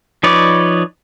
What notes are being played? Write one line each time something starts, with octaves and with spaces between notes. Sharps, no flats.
F3 D#4 B4 C#5 D5